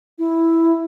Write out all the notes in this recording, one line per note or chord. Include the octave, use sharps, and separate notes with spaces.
E4